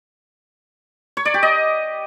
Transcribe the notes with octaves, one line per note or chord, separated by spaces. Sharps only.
C#5
D5
G4
D#5